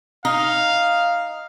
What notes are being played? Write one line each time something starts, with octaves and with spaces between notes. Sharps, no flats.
D#4 F5